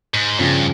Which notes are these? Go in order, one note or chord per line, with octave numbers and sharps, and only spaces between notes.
G#2
G2 C#3 F3